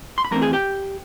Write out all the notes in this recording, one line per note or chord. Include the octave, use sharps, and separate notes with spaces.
C6
B5
F#2 C#3 E3 A3 C4 A#4 A#5
G#4 G#5
G4 G5